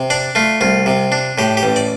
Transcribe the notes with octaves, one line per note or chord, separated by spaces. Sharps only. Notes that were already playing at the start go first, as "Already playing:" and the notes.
Already playing: C3
D4 D5
A3 F4
C2 F4
C3
D4
A2 G4
G4
A1
D5